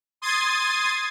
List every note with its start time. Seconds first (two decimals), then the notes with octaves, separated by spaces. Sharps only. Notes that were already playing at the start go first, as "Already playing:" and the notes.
0.22 C6 D#6 G#6 A6 C7 D#7